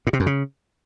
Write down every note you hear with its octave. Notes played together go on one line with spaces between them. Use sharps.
A2
C3
F#2
C#3